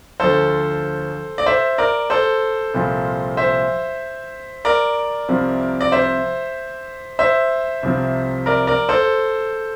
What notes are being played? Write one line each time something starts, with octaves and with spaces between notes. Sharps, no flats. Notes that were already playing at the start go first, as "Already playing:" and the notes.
D2 D3 F3 A4 C5
D5
C5 E5
A#4 D5
A4 C5
C2 A#2 F3
C5 E5
A#4 D5
C2 C3 F3
D5
C5 E5
C5 E5
C2 C3 F3
A#4 D5
A#4 D5
A4 C5